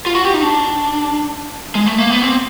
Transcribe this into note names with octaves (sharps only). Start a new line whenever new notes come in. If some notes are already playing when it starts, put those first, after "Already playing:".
F4
F#4
G4
D#4
D4
G#3
A3
A#3
B3
C4